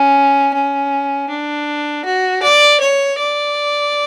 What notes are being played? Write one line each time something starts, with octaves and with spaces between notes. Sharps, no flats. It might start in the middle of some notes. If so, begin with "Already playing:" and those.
Already playing: C#4
C#4
D4
F#4
D5
C#5
D5